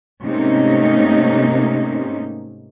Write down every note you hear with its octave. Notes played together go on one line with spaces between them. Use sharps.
G#2 C3 A3 A#3 C#4 D#4